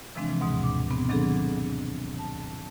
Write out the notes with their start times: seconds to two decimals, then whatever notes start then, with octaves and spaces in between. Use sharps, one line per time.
0.15 C3 E3 F3 G#3 C4 D4
0.41 D2 G#2 B2
0.63 D6
0.90 B2 B3 C4
1.09 D#3 F#3 C4 D4 G#4 A4
2.19 A5